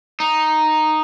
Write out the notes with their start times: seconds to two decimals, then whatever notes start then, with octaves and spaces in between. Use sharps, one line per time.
0.20 D#4